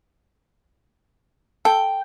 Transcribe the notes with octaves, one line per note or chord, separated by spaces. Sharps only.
A4 G5